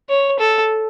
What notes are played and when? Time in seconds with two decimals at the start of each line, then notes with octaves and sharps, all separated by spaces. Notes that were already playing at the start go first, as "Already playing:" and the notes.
0.09 C#5
0.39 A4